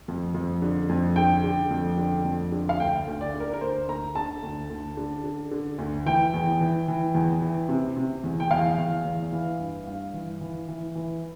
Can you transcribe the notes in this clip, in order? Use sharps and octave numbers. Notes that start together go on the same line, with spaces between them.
F2
F2
D3
F2
D3 G5
D3
F2
D3
F2
D3
F5
D2 G5
D2
D5
D3
A#4
A#4
D2 C5
D2 A#5
D3 A5
D2
D2
D3
D3
D3
D2
E3 G5
E2
E3
E3
E2
E3
C3
C3
E2
G5
E2 F5
E2
E2
E3
G2
G2
E3
E3
E3
E3